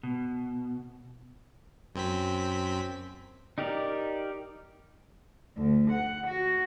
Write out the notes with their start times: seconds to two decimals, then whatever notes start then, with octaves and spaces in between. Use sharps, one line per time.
0.03 B2
1.95 F#2 C4 B6
3.58 D#4 G4 A#4 D5
5.58 D2
5.91 F#5
6.27 F#4